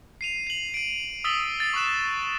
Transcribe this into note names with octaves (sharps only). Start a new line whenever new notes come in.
C7 D#7 F7
C7 F#7
D7 D#7
D#6 E6 A6 B6 F#7 G7
A6 C7
C#6 D#6 F#6 E7